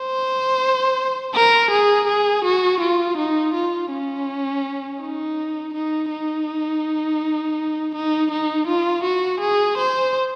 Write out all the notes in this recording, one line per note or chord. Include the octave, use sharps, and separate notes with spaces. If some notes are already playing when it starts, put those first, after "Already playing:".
Already playing: C5
A#4
G#4
G#4
F#4
F4
D#4
F4
C#4
D#4
D#4
D#4
D#4
D#4
F4
F#4
G#4
C5